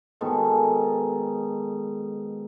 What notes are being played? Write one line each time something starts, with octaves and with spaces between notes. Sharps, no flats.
B2 D#3 G#3 A4